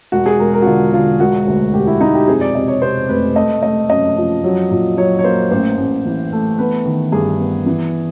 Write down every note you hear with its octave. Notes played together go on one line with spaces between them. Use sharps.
E1 F#4
G#4
E1 A#4
A#4
F#4
D3 F4
D3 F4
E1 F#4
D2
E1 G4
E4
E1 D#4
G4
F2 G#4
D5
C3 D#5
C#5
C3 C5
F1 B4
A3 D#5
A3 D#5
F#2 D#5
F3
F#3
A#2
F#3 C#5
C#5
A#3 C5
A1 C5
A1
E3
A3
B3 B4
D#3
G2 G#4
B3
E3